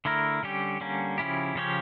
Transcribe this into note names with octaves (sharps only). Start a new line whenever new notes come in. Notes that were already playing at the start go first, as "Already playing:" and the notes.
D3 A3 E4 A#4
D3 G3 C#4 G4
D3 G3 A#3 C#4
C#3 F3 C#4 E4 G4
C#3 F3 C#4 G4 C#5